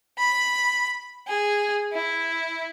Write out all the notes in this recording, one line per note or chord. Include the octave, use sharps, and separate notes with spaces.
B5
G#4
E4